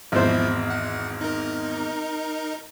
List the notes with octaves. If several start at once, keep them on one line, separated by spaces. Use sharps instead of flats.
G#1 E2 F3 E4 C5
F#5
D#4 A#4